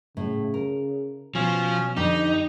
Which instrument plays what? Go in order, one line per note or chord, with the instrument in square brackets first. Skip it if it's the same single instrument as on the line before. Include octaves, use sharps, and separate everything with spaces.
[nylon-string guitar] A2 [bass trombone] C#3
[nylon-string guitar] A#4
[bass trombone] B2 [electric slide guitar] F3 F4 [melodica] C#4
[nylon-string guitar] F2 [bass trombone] D3 [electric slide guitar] D#4 [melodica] G4